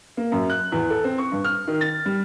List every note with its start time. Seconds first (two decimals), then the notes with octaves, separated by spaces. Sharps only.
0.17 A#3
0.32 F#2
0.50 F#6
0.72 E2
0.90 A4
1.04 C4
1.18 C#6
1.32 G2
1.44 F6
1.67 D#3
1.81 A6
2.06 G3